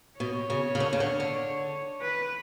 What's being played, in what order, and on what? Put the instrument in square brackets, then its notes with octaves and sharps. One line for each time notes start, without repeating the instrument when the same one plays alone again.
[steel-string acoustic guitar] B2 [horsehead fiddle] C#5
[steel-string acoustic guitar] C#3
C#3
D3
C#3
D3
D3
[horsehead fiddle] B4